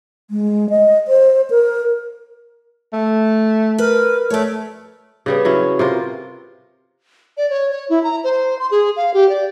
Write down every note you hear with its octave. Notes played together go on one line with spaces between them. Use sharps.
G#3
D#5
C5
A#4
A3
A#4 B4
A3 C#5 D5
C#3 G3 B3
F#3 C#4 E4
C3 F4 A#4
D5
C#5
C#5
E4
A#5
C5
C6
G#4
F5
G4
D5